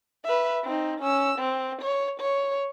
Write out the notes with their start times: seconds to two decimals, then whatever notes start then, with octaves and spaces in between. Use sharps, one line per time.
0.24 B4 E5
0.64 C4 D#4
1.00 C#4 E6
1.39 C4
1.82 C#5
2.20 C#5